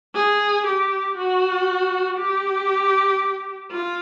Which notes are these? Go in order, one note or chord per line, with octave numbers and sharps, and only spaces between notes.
G#4
G4
F#4
G4
F4